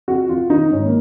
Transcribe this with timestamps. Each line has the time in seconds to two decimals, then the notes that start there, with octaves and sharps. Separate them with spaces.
0.08 F2 F#4
0.29 F2 F4
0.50 D#3 D#4
0.71 G#2 C#4
0.86 A#3